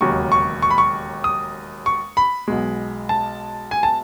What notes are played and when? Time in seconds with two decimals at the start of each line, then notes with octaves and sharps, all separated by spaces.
0.01 E1 D#2 C#3 F#3 C#6
0.32 C#6
0.62 C#6
0.71 B5
0.78 C#6
1.24 D#6
1.86 C#6
2.17 B5
2.48 B1 B2 G#3
3.09 A5
3.71 G#5
3.83 A5